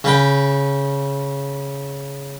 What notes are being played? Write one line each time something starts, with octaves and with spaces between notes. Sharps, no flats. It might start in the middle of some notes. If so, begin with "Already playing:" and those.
C#3 B4 G5